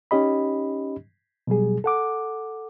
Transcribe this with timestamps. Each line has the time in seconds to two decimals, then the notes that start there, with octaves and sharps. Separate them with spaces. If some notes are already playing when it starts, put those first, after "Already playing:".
0.11 C#4 D#4 G4 D#5 B5
1.47 B2 F#3 G3 G#4
1.84 A4 F#5 D6